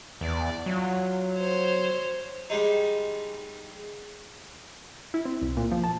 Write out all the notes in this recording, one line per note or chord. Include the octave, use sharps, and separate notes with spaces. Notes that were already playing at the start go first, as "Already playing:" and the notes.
E2 D5
F#3 F4
C5 C#5
G3 G#3 D#4
E4
C4
C2
A#2
F3
A5